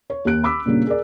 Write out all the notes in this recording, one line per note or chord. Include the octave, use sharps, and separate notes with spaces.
C#5
D#2 A#3 G4 F#6 D7
B5 D6 E6 B6
A#2 C#3 G3 A#3 D4
G#4 A#4 D5